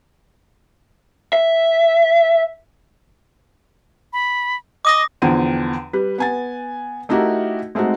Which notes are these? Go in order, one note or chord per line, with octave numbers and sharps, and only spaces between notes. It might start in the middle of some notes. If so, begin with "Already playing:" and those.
E5
B5
D#5 D6 D#6 A#6
E2 D3 F3 G5 D#7
G3 B4
B3 G#5 A6
A3 D#4 E4 F#4 G4 A#4
G#3 A3 C4 D#4 F#4